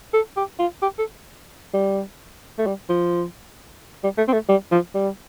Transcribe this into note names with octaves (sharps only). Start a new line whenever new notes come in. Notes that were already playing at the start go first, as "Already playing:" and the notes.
A4
G4
F4
G4
A4
G3
A3
G3
F3
G3
A3
C4
A3
G3
F3
G3